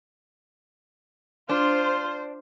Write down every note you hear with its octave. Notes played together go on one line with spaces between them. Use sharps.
D4 F4 C5